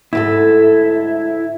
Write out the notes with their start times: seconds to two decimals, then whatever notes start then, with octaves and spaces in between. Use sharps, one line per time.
0.13 D2 G#2 E4 A4